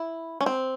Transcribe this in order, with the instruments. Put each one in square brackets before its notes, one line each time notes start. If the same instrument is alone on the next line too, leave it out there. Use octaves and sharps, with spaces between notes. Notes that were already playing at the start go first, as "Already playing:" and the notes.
Already playing: [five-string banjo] E4
C#4
C4